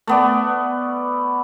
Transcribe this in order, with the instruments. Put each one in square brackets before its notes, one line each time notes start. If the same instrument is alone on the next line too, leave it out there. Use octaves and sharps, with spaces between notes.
[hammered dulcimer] A3 B3 D5